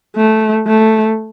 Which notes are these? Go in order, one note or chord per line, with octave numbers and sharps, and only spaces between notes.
A3
A3